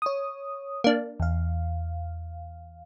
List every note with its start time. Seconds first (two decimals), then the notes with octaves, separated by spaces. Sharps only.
0.02 C#5 D#6
0.84 A#3 D4
1.20 E2 F5